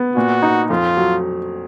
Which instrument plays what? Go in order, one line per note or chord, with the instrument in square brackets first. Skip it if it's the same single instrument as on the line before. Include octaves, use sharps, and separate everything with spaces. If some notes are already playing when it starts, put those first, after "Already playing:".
Already playing: [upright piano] B3
[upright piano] A#2 [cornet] F#4
[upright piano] D#4
[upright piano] F2 [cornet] F4
[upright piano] F#3